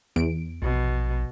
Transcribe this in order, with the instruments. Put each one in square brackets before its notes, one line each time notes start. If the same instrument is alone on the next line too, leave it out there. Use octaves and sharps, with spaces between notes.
[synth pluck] E2 D7
[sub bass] A#1 [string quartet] B2